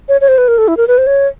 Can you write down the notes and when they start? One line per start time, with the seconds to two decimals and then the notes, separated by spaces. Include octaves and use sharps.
0.09 C#5
0.21 C#5
0.28 C5
0.38 B4
0.48 A#4
0.58 A4
0.68 E4
0.77 A#4
0.88 B4
0.98 C5
1.07 C#5